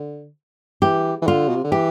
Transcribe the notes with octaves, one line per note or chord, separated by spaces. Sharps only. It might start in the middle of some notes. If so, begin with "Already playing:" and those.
Already playing: D3
E3 G4
E3
D3 F4
B2
C3
D3
E3 G4